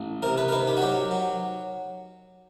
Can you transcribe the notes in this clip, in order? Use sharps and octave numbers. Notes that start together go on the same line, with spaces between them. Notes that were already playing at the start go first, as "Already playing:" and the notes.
Already playing: A1
C3 A#4
B4
A#4
D#3 B4
G4
F#4
F#3 G4
F#3